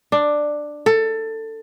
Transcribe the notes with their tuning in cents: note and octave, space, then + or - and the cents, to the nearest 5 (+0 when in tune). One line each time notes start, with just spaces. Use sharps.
D4 +10
A4 +20